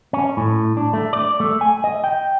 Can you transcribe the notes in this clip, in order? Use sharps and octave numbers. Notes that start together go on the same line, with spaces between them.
C#4
A2
D4
A3
D5
A3
G#5
D#5
G5